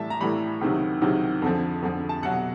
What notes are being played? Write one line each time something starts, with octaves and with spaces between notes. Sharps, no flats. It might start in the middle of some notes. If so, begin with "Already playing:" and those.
Already playing: A2 E3 G3 E5 A5
A#5
A2 E3 G3 B5
C#2 C3 D#3 F#3
C#2 C3 D#3 F#3
F2 D3 F3
F2 D3 F3
A5
C2 B2 F#3 F#5